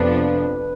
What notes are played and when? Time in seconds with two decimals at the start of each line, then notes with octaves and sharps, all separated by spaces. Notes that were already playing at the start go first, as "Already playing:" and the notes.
Already playing: F2 C3 F3 B3 D4 B4